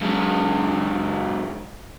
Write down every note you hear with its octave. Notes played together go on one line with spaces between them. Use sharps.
F#2 G#3